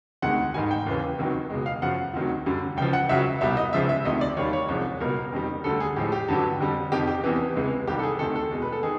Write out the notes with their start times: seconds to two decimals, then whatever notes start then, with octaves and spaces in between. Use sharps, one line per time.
0.22 D2 C3 D#3 G#3 F#5
0.54 G#2 D#3 G3 G#5
0.71 G5
0.86 D#2 C#3 E3
1.18 C#2 C3 D#3 F#3
1.50 C#2 B2 G#3
1.66 F5
1.82 F#2 C#3 F3 F#5
2.13 D2 C3 D#3 F#3
2.46 F#2 D3 G3
2.77 C#2 C#3 F3 G5
2.93 F#5
3.09 C#2 C#3 F#3 E5
3.41 C2 B2 G3 E5
3.57 D#5
3.73 C#2 C#3 F3 G#3 E5
3.89 E5
4.05 D2 C3 D#3 D#5
4.21 D5
4.37 D#2 D#3 G3 C#5
4.53 C#5
4.69 C2 C3 F3 G#3
5.00 C#2 B2 G3 A#4
5.32 F2 C3 D#3 G3
5.64 D2 D3 G3 A4
5.80 G#4
5.96 A2 F3 G#3 G4
6.12 G4
6.28 G2 D3 F#3
6.60 F2 D3 G3
6.92 F2 C3 D#3 G4
7.07 G4
7.24 E2 C3 E3
7.55 C#2 C3 E3 G#3
7.87 C2 C3 D#3 G3 G4
7.99 A4
8.03 G#4
8.19 D2 C3 D#3 A4
8.35 A4
8.51 E2 B2 G#3
8.62 B4
8.72 A4
8.83 D#3 G#4